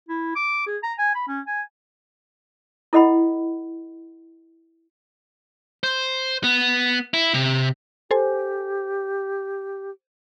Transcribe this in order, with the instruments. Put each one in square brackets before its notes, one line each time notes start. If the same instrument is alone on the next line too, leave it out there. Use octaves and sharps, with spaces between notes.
[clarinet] E4
D6
G#4
A#5
G#5
B5
C#4
G#5
[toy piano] E4 A4 D#5 F#5 B5
[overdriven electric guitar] C5
B3
E4
C3
[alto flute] G4 [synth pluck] A4 C5 G#5